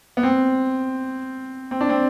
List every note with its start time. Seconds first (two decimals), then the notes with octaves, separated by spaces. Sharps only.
0.17 B3
0.23 C4
1.71 C4
1.81 D4
1.89 C4